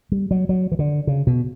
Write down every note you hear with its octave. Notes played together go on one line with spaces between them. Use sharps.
G3
F#3
F#3
E3
D3
C#3
B2